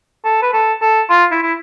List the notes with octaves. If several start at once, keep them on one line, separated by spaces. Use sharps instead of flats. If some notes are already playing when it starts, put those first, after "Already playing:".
A4
B4
A4
A4
F4
E4
E4